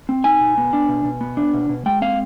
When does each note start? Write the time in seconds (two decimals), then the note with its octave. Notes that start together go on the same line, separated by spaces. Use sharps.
0.09 C4
0.24 D#4 G#5
0.41 B2
0.58 B3
0.73 D4
0.89 B2
1.05 B2
1.21 B3
1.37 D4
1.54 B2
1.69 B2
1.86 G#3 G5
2.02 C4 F5